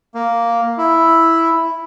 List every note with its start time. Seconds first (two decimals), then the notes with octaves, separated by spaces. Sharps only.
0.15 A#3
0.78 E4